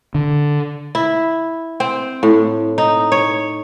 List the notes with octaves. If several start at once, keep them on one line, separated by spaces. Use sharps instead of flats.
D3
E4
C4
A2
D#4
C#5